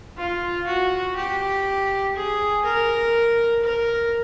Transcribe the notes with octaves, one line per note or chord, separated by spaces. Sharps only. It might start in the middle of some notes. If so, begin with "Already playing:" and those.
F4
F#4
G4
G#4
A#4
A#4